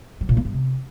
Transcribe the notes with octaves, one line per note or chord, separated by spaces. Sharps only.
F#3
A#2
A#3
G2
C3